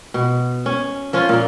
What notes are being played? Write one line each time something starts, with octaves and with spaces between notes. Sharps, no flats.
B2
C#4
F3 C#4 F4
A#2 A#3